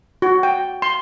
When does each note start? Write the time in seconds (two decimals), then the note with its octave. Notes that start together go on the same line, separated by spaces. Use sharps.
0.22 F#4
0.43 G5
0.82 C6